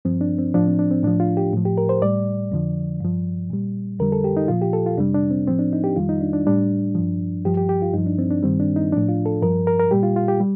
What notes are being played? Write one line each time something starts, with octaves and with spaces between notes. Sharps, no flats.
G2 F3 C4
D4
C4
A2 F3 D4
C4
D4
C4
A2 F3 D4
F4
G4
A2 F3
G4
A#4
C5
A2 G3 D5
F2 D3 F3
G2 F3
A#2 G3
F2 D3 G3 A#4
A4
G4
D#4
A#2 F3 F4
G4
A4
F4
F2 C3 G3 D4
D4
C4
A2 F3 C4
D4
D#4
G4
F2 D#3 G3 F4
D#4
D4
D4
A2 G3 D4
G2 F3
G2 F3 G4
G4
G4
F4
G2 F3 D#4
D4
C4
D4
G2 D#3 G3 C4
D4
D#4
A2 F3 D4
F4
A4
G2 F3 A#4
A#4
A#4
A#2 G3 G4
F4
F4
G4
G3